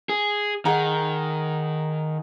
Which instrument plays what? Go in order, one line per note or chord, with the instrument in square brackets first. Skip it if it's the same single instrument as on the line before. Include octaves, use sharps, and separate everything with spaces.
[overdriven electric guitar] G#4
[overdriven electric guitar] D#3 [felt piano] G#4 F#5 A#5